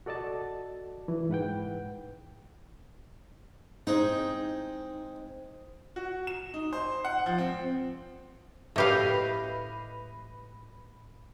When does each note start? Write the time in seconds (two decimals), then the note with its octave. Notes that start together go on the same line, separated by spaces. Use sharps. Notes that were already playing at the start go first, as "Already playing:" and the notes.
0.06 F#4 A4 D5 D#5 A5
1.08 E3
1.29 G#2 B4 F#5 G5
3.87 G#3 C4 D#4 G#4
5.96 F#4
6.27 E7
6.54 D#4
6.73 C5
7.05 F#5
7.26 F3
7.38 C4
8.76 A2 G4 B4 D#5 F5